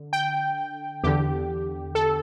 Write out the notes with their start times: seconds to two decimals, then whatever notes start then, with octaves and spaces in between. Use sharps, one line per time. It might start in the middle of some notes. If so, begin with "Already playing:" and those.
Already playing: D3
0.13 G5
1.03 E2 D3 G4
1.95 A4